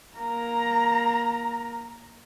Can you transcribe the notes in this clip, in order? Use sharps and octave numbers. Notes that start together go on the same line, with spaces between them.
A#3 A#5